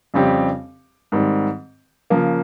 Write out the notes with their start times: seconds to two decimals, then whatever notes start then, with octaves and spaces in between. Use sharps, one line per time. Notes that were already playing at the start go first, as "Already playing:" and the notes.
0.14 F2 C#3 G3 C4 G4
1.12 G#2 D#3 G3 C4
2.10 C#3 F3 A#3